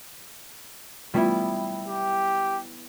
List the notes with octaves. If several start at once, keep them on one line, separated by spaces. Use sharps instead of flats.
G3 A3 B3 E4 F4 B5
G4